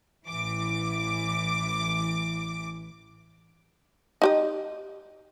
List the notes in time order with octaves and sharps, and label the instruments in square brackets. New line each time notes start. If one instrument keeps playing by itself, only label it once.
[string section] A1 E3 D6
[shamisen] D#4 G4 D#5